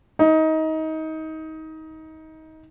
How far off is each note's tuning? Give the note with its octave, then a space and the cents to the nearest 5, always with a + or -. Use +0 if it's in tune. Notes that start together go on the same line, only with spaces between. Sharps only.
D#4 +25